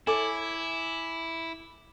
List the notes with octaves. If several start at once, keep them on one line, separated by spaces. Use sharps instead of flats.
E4 A4 C#5 G#5 D6